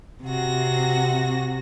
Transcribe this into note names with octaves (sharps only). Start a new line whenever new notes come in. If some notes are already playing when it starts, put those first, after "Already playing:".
C3 F#4 A#6